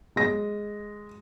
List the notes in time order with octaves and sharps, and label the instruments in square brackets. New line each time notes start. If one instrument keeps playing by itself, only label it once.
[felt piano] G#3 A#6